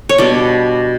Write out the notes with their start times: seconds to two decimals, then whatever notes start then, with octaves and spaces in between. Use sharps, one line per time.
0.09 C#5
0.18 B2 G3 D4 D5